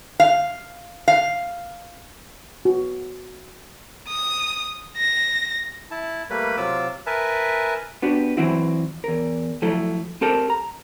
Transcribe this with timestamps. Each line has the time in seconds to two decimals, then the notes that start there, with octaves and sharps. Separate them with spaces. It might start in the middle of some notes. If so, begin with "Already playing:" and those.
0.20 F5
1.08 F5
2.65 F#4
4.09 D#6
4.97 A#6
5.91 E4 A5
6.30 G3 A3 A#3 B4 B5
6.57 C3 F#3 F4 D6 E6
7.06 A#4 B4 E5 G#5 A5
8.02 B3 D4 F#4 G4
8.37 E3 F#3 C4 E4 F#4
9.04 E2 A#4
9.62 F3 F#3 A3 E4 A4
10.21 C4 G4 A4 A#4
10.50 A#5